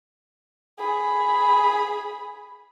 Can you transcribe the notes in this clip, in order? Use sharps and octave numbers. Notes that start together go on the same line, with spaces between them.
G#4 B5